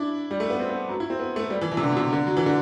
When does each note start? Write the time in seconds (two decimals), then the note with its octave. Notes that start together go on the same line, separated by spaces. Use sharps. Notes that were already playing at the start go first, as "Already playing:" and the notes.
Already playing: D4 E4
0.31 G3
0.40 A3
0.50 B3
0.59 C4
0.70 B3
0.89 F#3
1.00 E4
1.10 C4
1.20 B3
1.36 A3
1.50 G3
1.61 E3
1.72 E3
1.77 C3
1.82 D3
1.92 B2
1.97 C3
2.13 D3
2.27 F#3
2.37 E3
2.46 D3